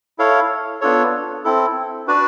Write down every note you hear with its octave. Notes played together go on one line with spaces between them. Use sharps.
E4 A4 C#5 F5
B3 D4 F4 A4 C#5
C4 E4 A4
D4 F#4 B4 D5